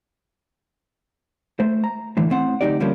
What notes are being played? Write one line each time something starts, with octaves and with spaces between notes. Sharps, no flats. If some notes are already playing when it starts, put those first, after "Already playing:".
A3 C5
A#5
A2 D3 E3
A2 C4 F#5
D2 A#2 F#3 D#4 G4 D5
D3 F3 G3 A3 A#3 C#4